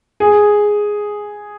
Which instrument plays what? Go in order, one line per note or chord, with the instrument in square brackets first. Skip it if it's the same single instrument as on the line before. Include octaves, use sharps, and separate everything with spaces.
[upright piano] G#4